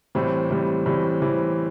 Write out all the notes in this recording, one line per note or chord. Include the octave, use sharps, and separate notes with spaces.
A2 E3 G3 C4
A2 E3 G3 C4
A2 E3 G3 C4
A2 E3 G3 C4